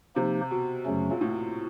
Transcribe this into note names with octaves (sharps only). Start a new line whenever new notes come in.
C3 F3 A#3 D#4 G4 C5
B2
F#2 C#3 F#3 A3 C#4
A#2
A2